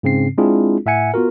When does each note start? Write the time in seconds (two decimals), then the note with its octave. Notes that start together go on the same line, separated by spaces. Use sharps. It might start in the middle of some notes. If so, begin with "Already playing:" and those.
0.03 G#2 C#3 C4 C7
0.38 G#3 C4 D4 E4 F4 G#4
0.86 A2 E5 F#5 G#5 C#7
1.14 B3 F4 F#4 A#4